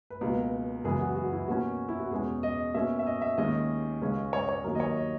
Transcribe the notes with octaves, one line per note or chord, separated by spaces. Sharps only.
B4
C#2 B2 A#3 A#4
F#2 C#3 E3 G#3 B3 G#4
F#4
F#4
E4
B2 A#3 C#4 F#4
E4
F#4
E2 B2 G#3 C#4 G#4
D#5
B2 A#3 C#4 E5
E5
D#5
E5
D#2 D#3 G#3 C#4 D#5
C#2 C#3 G#3 C#4
C#5
C#5
D#2 D#3 F#3 A#4
D#5
C#5
D#5